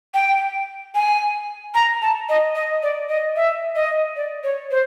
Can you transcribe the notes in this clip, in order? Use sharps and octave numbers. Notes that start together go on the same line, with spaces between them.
G5
G#5
A#5
A5
D#5
D#5
D5
D#5
E5
D#5
D5
C#5
C5